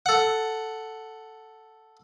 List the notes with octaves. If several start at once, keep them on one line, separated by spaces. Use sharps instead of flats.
A4 F#5